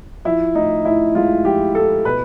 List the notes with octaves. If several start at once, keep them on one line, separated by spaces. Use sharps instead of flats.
F3 E4
A2 D#4
A2 E4
G#3 F4
F3 G4
A2 A4
B2 B4